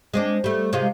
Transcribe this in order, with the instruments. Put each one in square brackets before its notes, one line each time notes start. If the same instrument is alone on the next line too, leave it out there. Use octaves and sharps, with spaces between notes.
[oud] G#3 C4 D4
G3 A3
C3 G#3 F4